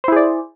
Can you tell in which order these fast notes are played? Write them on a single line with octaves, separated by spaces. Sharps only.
C5 E4 G#4 D5